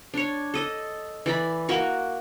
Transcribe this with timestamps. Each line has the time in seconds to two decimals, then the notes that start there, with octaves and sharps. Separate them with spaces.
0.14 D4 C#5
0.54 A4 D#5
1.26 E3 D5 B5
1.69 A#3 F#4 A#4 C#6